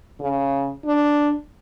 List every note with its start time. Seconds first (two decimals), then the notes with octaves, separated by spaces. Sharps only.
0.20 C#3
0.85 D4